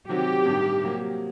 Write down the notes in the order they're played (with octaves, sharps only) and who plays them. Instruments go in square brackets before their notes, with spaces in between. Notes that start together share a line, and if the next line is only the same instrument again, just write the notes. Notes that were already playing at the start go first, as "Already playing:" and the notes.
[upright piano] C3 D#3 F#3 C4 F#4 [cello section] G4
[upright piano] A1 G2 D#3
C3 F#3 A#3